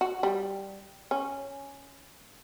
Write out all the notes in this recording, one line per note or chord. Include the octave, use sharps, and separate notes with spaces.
F#4
G3
C#4